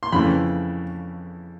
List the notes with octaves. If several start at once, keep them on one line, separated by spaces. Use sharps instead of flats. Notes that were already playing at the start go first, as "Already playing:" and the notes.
C6
F2 C#3 E3 A3 B5